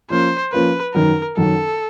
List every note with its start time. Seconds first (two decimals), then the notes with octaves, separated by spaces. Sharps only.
0.10 F3 A#3 C#4 F4 A#4 C5
0.53 F3 A#3 C#4 F4 A#4 B4
0.94 F#2 D#3 F#3 A#4
1.37 F#2 D#3 F#3 A4